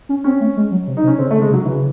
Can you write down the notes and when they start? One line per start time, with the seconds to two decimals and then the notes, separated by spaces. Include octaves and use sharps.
0.09 C#4
0.24 C4 C#4
0.41 A3
0.56 G#3
0.71 F#3
0.87 C3
0.97 D#4
1.03 C3
1.07 C#4
1.19 C#3 C4
1.31 A3
1.34 C#3
1.42 G#3
1.50 C3
1.53 F#3
1.66 C#3 E3